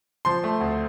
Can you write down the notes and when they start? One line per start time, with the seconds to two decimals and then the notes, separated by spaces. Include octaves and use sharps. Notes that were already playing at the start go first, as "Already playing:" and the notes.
0.25 F3 C6
0.44 A3
0.61 D2